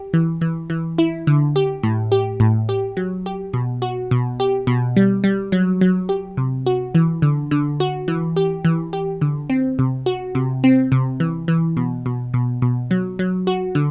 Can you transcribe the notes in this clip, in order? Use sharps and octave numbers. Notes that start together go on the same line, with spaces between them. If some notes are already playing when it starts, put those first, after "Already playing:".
Already playing: G4
E3
E3
E3
E4
D3
G4
A2
G4
A2
G4
F#3
G4
B2
F#4
B2
G4
B2
G3
G3
F#3
F#3
G4
C3
F#4
E3
D3
D3
F#4
E3
G4
E3
G4
D3
C4
C3
F#4
C3
C4
C3
E3
E3
B2
B2
B2
B2
F#3
F#3
F#4
D3